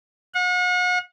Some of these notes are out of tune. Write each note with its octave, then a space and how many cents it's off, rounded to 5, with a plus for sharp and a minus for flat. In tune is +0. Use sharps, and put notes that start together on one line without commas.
F#5 -40